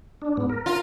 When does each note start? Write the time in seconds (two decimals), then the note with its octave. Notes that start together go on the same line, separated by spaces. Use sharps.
0.22 D4
0.37 G#2 B3
0.50 A#4
0.66 F4